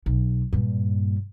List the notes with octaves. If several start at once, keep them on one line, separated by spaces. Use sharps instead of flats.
B1
G2 A#2